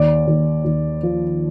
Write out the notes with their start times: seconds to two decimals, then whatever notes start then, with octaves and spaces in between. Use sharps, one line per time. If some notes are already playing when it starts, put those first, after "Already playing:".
Already playing: D#2 D5
0.27 D#2
0.65 D#2
1.03 F3